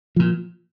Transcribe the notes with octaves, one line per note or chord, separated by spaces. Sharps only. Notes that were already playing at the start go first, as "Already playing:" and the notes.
A#2 F3